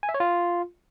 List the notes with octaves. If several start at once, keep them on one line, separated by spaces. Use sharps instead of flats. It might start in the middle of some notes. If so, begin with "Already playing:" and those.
G#5
E5
C#5
F4